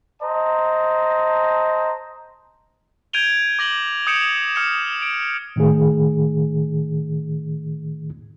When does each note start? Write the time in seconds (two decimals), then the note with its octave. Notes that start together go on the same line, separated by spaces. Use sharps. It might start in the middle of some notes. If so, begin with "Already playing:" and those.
0.22 C5 D#5 A5 A#5
3.13 G6 G#6 D7 D#7 F7 G7
3.59 D6 A#6 F#7 G7
4.07 D#6 G6 C#7 D7 E7
4.55 D#6 F6 C#7 E7
5.02 D7
5.56 A2 D#3 A3 G#4